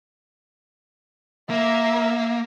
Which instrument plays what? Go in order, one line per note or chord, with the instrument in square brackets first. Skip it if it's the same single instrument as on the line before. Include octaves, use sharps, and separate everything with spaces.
[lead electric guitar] A#3 [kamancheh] E5